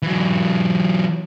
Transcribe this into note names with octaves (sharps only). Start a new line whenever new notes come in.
E3 F#3